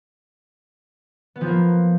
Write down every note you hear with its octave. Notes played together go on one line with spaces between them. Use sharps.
B3
F3
A#3